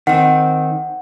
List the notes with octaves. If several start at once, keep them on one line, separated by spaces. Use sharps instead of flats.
D#3 C4 F#5